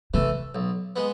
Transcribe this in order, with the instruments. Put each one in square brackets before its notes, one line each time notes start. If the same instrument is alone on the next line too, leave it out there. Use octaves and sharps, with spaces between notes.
[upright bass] C3 [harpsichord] E3 A3
[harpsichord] B1
G#3 B3